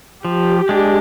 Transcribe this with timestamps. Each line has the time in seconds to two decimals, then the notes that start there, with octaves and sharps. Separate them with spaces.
0.25 F3 G4
0.69 G#3 D4